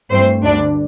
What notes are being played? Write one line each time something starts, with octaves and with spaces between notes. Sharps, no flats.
G2 E3 A3 C4 C5
D2 D3 G3 D4 D5